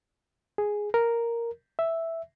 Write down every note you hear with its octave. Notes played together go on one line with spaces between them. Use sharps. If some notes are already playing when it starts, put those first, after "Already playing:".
G#4
A#4
E5